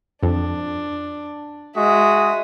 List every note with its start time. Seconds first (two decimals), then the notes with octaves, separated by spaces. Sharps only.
0.23 F2 D4
1.76 G#3 F#4 E5 D#6